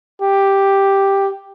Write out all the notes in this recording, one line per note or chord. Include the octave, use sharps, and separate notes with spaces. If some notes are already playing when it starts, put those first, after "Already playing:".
G4